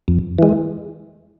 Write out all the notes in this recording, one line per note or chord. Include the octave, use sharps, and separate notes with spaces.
F2
E3 G#3